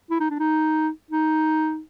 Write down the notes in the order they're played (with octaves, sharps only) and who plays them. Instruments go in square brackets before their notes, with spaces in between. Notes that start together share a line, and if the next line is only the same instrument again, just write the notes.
[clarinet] E4
D#4
D4
D#4
D#4